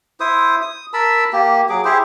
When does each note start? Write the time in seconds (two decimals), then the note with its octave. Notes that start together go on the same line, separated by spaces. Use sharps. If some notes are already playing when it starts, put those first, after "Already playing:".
0.20 E4 C5 D#6
0.62 D#6
0.93 A#4 A5 B5 E6
1.32 A#3 G4
1.69 F#3 G#4 D6
1.85 E4 G4 G#4 C5